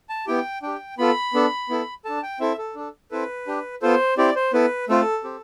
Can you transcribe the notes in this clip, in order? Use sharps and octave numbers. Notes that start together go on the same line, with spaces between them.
A5
B3 E4 G4 G5
D4 G4 G5
B3 F4 A4 B5
B3 D4 A4
B3 E4 A4
D4 A4 A5
G5
C4 E4 A4 E5
A4
D4 A4
C4 E4 A4 B4
D4 G4
B3 F4 A4 C5
C4 E4 G4 D5
C5
B3 E4 A4 B4
A3 C4 F4 A4
C4 G4